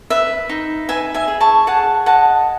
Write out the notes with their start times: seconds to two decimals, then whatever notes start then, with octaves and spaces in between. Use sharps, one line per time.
0.10 B4 E5
0.49 D#4
0.89 B4 E5 G#5
1.14 E5 G#5
1.28 G#4
1.41 A5 C#6
1.67 G#4 F#5 A5
2.06 D#5 F#5 A5